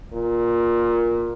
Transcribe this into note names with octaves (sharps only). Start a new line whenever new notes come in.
A#2